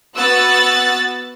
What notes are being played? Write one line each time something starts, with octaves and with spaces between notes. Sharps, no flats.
B3 F#4 E6 F#6 A6